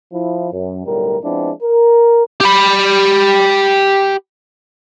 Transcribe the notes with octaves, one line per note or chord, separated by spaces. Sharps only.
F3 E4
F#2
B1 A2 D3 G3 A#4
F3 G#3 B3 C4 D4 E4
A#4
G4 B5